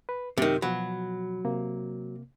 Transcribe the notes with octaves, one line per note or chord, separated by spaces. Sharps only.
B4
F#2 C3 D#3
B2 F3 F#3 B5
C3 A#3